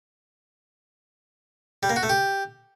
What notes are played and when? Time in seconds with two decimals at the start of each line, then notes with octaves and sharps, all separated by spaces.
1.83 G3
1.90 A#3
1.96 F#4
2.03 A3
2.09 G4